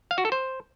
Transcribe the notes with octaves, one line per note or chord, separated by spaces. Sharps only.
F5
F#4
A4
C5